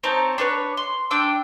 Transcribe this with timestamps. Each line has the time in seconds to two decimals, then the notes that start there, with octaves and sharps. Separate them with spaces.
0.04 C4 D#4 C#5 A5
0.38 D4 A4 B4 C#5
0.77 C6
1.11 D4 G5 D6 E6